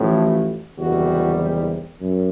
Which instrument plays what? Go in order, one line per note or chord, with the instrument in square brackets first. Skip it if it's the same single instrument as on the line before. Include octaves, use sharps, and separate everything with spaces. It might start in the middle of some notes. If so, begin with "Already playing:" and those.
Already playing: [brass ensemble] A1 A2 F3
F#1 E2 C3 D#3 G3 F#4
F#2